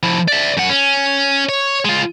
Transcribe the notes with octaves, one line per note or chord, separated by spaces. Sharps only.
F3 E4
D5 E5
F#2 F#5
C#4
C#5
G#3 F4